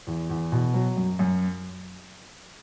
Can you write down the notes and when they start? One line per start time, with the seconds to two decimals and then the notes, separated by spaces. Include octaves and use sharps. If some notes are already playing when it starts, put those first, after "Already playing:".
0.07 E2
0.30 E2
0.52 B2
0.74 F#3
0.97 F#2
1.19 F#2